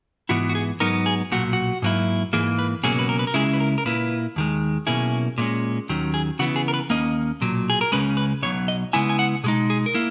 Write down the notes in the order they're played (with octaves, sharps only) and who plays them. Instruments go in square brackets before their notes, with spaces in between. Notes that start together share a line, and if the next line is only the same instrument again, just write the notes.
[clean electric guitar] G#2 E3 B3 E4 F#4
F#4
G#4
G#2 F#3 B3 D#4 A#4
G#4
B1 A#2 F#3 F#4
F#4
G#2 F#3 A#3 E4
G#2 E3 A#3 G#4
B4
C#2 B2 F#3 A#3 C#4 G#4
B4
A#4
B4
A#4
C#2 C#3 G#3 C#4 E4 G#4
B4
A#4
A#4
A#2 A#3 E4 B4
D#2 D#3 G#3
B1 B2 A#3 C#4 E4 G#4
A#2 G#3 C#4
D#2 D#3 F#3 C#4
G#4
C#3 E3 B3 F#4
G#4
A#4
B4
D#2 D#3 A#3 C#4 D#5
B1 A#2 F#3
G#4
A#4
C#2 C#3 G#3 C#4 B4
B4
B1 B2 F#3 C#5
D#5
C#3 G#3 B3 E4 G#5
G#5
F#5
B2 G#3 D#4 G#4
G#4
A#4
A#3 E4